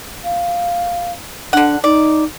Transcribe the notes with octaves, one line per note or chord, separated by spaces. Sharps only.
F5
D3 D4 F#5
D#4 D5